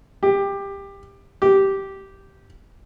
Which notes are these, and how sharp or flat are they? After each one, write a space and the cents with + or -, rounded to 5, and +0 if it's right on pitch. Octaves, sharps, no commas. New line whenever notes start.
G4 +15
G4 -10